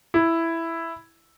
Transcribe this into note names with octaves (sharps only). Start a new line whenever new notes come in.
E4